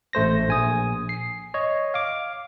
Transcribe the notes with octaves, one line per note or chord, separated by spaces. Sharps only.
A1 A3 C5 A#6
A#1 G#5 D#6
C7
C#5 D#5
F5 D6